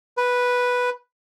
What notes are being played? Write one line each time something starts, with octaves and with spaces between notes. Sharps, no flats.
B4